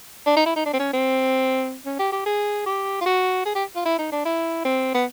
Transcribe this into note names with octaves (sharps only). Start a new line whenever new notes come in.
D4
D#4
E4
D#4
D4
C4
C#4
C4
C#4
G4
G4
G#4
G4
F4
F#4
G#4
G4
F4
E4
D#4
D4
E4
C4
B3